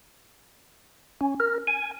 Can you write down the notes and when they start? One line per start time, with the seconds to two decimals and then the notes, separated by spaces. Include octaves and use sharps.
1.21 C#4
1.40 A#4
1.67 G#5